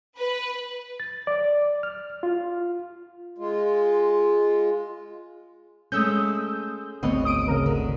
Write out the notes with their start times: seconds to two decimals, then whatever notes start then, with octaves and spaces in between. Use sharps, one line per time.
0.17 B4
1.00 A6
1.27 D5
1.83 F6
2.23 F4
3.38 G#3 F4
5.92 G#3 A3 C#4 D#6 E6 G6
7.03 G#1 D2 B3 C4 C#5 D#5
7.25 D#6 D7 D#7
7.48 C#3 A#4
7.66 D3